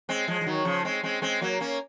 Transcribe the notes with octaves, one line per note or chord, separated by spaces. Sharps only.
G#3 C4
F3 G#3
F3
D#3 F#3
C#3 F3
G#3 C4
G#3 C4
G#3 C4
F#3 A#3
A#3 C#4